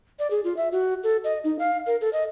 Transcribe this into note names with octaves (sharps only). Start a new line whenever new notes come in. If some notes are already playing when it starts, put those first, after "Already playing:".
D5
G#4
F4
E5
F#4
A4
D#5
D#4
F5
A#4
A4
D#5